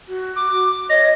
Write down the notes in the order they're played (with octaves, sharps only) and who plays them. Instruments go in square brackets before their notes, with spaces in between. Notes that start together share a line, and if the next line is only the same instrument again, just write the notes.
[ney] F#4
[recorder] D6
[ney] C#5 [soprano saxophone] D#5 [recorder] A#6